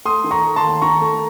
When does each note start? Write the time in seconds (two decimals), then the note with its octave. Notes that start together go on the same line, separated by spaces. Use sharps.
0.05 A3 C6 D#6
0.24 D#3
0.31 A#5 C#6
0.44 A3
0.56 A5 C6
0.63 D#2
0.82 D#3 A#5 C#6
1.01 A3